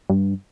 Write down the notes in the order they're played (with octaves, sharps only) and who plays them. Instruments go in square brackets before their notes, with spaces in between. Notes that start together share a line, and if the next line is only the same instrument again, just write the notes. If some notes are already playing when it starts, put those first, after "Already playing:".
[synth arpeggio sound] G2